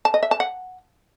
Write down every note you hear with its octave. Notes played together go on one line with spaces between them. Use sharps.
A5
D#5
E5
A5
F#5